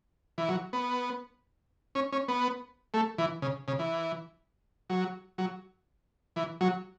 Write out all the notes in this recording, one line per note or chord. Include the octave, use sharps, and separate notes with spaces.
E3
F#3
B3
C#4
C#4
B3
A3
E3
C#3
C#3
E3
F#3
F#3
E3
F#3